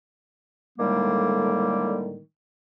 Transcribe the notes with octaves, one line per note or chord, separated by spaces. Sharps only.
A2 D3 D#3 G3 G#3 A#3